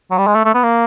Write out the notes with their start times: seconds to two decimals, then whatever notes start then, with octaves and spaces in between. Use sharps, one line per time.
0.11 F#3
0.18 G3
0.27 G#3
0.35 A3
0.45 A3
0.54 B3
0.63 A#3